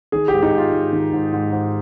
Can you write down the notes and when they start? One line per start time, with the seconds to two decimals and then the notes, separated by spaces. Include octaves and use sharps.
0.12 D#3 G#4
0.28 G#2 G4
0.42 D#4
0.53 G#2
0.58 F4
0.73 G#2
0.93 D#3
1.12 G#2
1.33 G#2
1.52 G#2